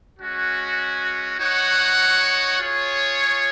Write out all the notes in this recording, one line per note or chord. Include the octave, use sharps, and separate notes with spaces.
G#3 C#4 F#4
D#4 F#4 C#5 F#5
F4 G#4 C#5